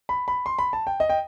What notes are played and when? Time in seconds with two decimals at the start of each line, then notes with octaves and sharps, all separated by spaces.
0.09 B5
0.28 B5
0.46 C6
0.59 B5
0.73 A5
0.87 G5
1.00 D#5
1.10 G5